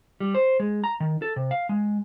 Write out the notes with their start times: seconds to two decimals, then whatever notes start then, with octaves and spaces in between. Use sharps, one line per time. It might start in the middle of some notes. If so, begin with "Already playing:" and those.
0.20 G3
0.34 C5
0.60 G#3
0.84 A#5
1.00 D#3
1.22 A4
1.36 C3
1.51 F5
1.69 G#3